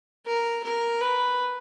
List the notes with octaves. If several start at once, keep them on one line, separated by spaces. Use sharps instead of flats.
A#4
A#4
B4